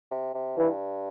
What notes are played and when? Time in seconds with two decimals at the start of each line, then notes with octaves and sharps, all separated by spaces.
0.11 C3
0.34 C3
0.57 G2 E3